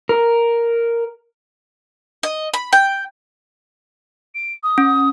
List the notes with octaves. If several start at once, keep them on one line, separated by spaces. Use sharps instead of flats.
A#4
D#5
B5
G5
D7
D#6
C#4